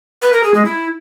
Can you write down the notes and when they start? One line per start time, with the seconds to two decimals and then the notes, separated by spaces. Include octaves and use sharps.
0.22 B4
0.33 A#4
0.44 G#4
0.54 G#3
0.65 E4